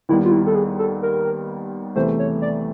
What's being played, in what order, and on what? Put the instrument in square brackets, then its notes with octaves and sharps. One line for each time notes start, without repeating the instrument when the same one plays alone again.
[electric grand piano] D#2 D#3 G3 B3 [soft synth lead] E4
[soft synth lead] F4
E4
A4
G#4
A4
A#4
[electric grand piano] E2 C3 E3 A3 [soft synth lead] C5
[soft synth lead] C#5
D5